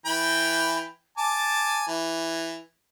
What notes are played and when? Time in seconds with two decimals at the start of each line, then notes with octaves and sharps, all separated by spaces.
0.06 E3 G5 B5
1.18 G#5 A5 D6
1.87 E3